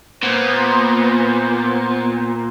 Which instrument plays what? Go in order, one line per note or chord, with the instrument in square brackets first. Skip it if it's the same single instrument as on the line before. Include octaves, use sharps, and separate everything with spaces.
[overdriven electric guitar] A#2 [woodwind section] A#3 C5 [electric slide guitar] B3